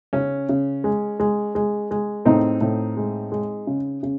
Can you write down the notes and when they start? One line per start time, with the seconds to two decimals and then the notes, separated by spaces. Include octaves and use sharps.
0.13 C#3 C#4
0.49 C#3
0.84 G#3
1.20 G#3
1.55 G#3
1.91 G#3
2.25 A2 C4 D#4
2.61 A2
2.97 G#3
3.32 G#3
3.67 C#3
4.03 C#3